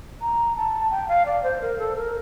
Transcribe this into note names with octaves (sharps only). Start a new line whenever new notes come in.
A#5
A5
G5
F5
D5
C5
A#4
A4
A#4